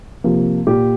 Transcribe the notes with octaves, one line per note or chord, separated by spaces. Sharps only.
C3 F3 A#3
A#2 G4